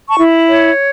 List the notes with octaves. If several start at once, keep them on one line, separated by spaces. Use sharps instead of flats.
A5 C#6
E4
C#5